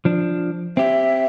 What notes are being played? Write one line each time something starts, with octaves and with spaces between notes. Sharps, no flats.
F3 D4
C4 G4 E5